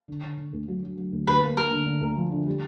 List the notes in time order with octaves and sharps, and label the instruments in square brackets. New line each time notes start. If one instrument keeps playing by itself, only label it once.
[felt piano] D3
D3
D3
D2
F#3
F#3
F#3
D2
[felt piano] D2 [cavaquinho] B4
[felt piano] A#3
[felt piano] A#3 [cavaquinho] A#4
[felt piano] D3
D3
D2
F3
D3
G3